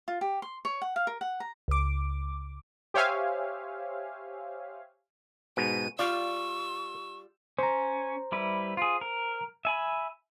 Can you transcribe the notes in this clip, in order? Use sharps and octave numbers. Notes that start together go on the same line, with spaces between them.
F4
G4
C6
C#5
F#5
F5
A#4
F#5
A#5
C#2 D6
G4 C5 C#5 E5 F5 G#5
G#2 B2 D#7
G3 F4 D5 F5 C#6 E6
C#4 C5 A#5
G3 E4 B4
F4 G#4
A#4
E5 G#5 B5